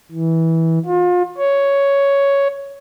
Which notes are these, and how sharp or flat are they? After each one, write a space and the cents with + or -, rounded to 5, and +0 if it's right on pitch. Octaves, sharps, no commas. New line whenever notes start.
E3 -15
F4 +35
C#5 +5